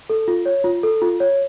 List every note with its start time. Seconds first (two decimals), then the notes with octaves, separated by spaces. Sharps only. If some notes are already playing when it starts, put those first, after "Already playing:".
0.10 A4
0.28 F4
0.46 C#5
0.64 F4
0.83 A4
1.02 F4
1.20 C#5